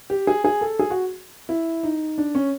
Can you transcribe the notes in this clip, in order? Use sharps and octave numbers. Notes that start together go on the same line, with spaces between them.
G4
G#4
G#4
A4
G#4
F#4
E4
D#4
D4
C#4